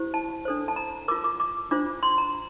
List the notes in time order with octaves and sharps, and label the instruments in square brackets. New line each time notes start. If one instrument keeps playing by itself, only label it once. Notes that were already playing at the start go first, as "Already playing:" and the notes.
Already playing: [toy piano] E4 G4 C5
A5
D4 A4 C5
A5
A#5
A#4 D6
F4
D6
D6
D4 F4 C5 D6
C6
A#5